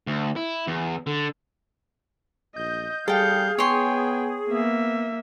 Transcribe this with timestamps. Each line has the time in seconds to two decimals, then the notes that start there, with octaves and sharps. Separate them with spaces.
0.07 D2
0.36 E4
0.67 E2
1.07 D3
2.56 A#1 D#5 G6
3.08 G3 G#4 A4 F5 G5 G6
3.58 B3 C#5 G5 G#5 C6
4.49 A#3 B3 E5